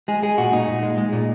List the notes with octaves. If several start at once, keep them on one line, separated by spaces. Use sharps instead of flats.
G#3 G#4
G#3 G#4
A#2 F#4
A#2 D#4
A#2
G#3
G#3
A#2